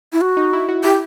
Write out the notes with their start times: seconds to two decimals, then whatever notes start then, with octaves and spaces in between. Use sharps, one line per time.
0.13 E4
0.21 F#4
0.37 D#4
0.53 E4
0.68 F#4
0.84 E4 G4